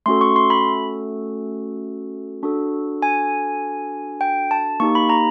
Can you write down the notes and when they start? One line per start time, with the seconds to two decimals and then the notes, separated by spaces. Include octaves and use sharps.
0.06 A3 C#4 F#4 A4 C6
0.21 C#6
0.36 C6
0.50 B5
2.43 D4 F#4 A4
3.02 G#5
4.21 G5
4.51 A5
4.80 A#3 D#4 G4 C#6
4.95 B5
5.10 A#5